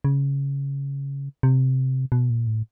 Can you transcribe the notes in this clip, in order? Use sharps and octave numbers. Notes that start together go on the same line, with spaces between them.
C#3
C3
B2
A#2
A2